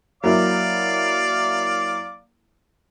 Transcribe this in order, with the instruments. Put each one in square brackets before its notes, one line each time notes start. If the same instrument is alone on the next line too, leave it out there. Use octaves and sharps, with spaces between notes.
[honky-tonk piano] F#3 A#3 E4 [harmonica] D5 F5 D6